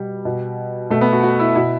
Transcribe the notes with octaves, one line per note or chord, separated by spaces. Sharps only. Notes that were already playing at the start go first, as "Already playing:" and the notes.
Already playing: B2 G3
B2
B2 A3
B3
F#4
F#4
E4
B2 E4